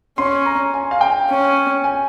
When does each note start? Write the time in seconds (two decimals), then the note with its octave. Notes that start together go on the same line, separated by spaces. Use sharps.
0.18 C#4 C6
0.46 A#5
0.74 G#5
0.91 F5
1.01 G5
1.29 C#4
1.84 G#5